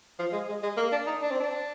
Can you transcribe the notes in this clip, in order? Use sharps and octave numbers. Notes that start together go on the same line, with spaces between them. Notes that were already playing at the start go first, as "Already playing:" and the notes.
F3
G#3
G#3
G#3
A#3
D4
D#4
D4
C4
D4